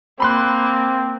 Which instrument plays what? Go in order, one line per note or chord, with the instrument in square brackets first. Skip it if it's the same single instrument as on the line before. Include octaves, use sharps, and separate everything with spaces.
[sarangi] A#3 [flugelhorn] C4 [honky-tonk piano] B5 C6 F#6